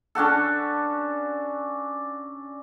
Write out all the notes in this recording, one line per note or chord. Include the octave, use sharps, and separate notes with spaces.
C#4 D4 F#4 A4